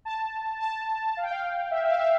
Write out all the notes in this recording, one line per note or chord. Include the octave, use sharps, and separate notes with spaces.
A5
A5
F5
G5
F5
E5
E5
F5
E5